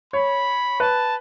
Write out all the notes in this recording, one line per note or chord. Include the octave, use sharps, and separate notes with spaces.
C#5 B5
B4 A5